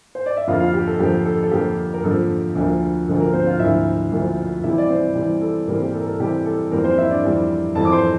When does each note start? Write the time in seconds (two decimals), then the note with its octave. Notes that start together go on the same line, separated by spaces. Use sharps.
0.15 C5
0.26 D5
0.37 E5
0.48 F2 D3 F3 A#3 F4 F5
0.60 F4 F5
0.74 G4
0.87 A4
1.00 F2 D3 F3 A#3 G4
1.25 A4
1.43 A4
1.51 F2 D3 F3 A#3 G4
1.94 A#4
2.04 F2 D3 F3 A#3 A4
2.55 D2 D3 F3 A#3
3.07 D2 D3 F3 A#3 A4
3.20 A#3 A#4
3.33 C4 C5
3.46 F4 F5
3.59 D2 D3 F3 A#3 E4 E5
4.11 D2 D3 F3 A#3
4.63 C3 E3 G3 C4 E4 E5
4.78 D5
4.89 C4 C5
5.15 C3 E3 G3 C4
5.41 A4
5.68 C3 E3 G3 A#3 C4 A#4
5.81 G4
5.94 A4
6.01 A#4
6.06 A4
6.19 C3 E3 G3 C4 G4
6.46 A4
6.71 F2 E3 G3 A#3 C4 A#4
6.84 C4 C5
6.97 E4 E5
7.10 D4 D5
7.24 F2 E3 G3 C4
7.75 F2 E3 G3 C4 A4 A5
7.85 D6
7.92 C5 C6